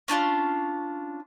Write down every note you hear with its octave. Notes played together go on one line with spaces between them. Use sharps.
C#4 D4 E4 F4